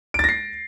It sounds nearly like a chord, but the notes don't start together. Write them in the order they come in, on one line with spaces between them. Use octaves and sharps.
D7 A6 A#6 C7